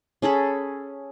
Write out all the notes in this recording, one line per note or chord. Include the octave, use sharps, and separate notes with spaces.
C#4 G#4 A4 B5